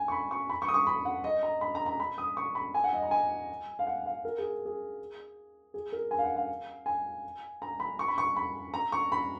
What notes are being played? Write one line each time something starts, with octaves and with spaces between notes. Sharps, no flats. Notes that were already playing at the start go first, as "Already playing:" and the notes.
Already playing: G#5
C#6
B5
C#6
B5
C#6
D#6
C#6
B5
F#5
D#5
A#5
B5
A#5
A#5
B5
D#6
C#6
B5
G#5
F#5
D#5
A#5
G#5
F5
F#5
F5
A#4
G#4
G#4
G#4
A#4
G#5
F5
F#5
F5
G#5
A#5
B5
C#6
B5
C#6
B5
A#5
C#6
B5